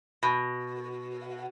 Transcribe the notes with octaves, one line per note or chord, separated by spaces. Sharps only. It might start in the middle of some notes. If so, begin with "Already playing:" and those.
B2